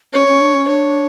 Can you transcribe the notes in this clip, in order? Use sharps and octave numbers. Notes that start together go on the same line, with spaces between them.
C#4 C#5
C#4
D4
C#4
D4 C#5